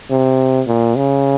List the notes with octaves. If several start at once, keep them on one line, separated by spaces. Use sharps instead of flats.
C3
A#2
C#3